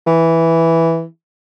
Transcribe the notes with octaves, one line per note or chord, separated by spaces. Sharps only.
E3